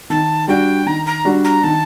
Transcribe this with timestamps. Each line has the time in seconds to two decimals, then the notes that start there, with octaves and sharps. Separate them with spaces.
0.10 D#3 A5
0.48 G3 D4 F#4 G5
0.86 D#3 A#5
1.06 A#5
1.25 G3 D4 F#4
1.44 A#5
1.64 D#3 A5